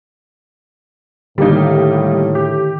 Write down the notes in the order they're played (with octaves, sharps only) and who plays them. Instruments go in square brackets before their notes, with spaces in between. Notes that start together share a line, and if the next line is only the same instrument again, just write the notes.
[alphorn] A2 [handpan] D3 D#3 [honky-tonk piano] G3 A#3 D#4
[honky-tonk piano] G4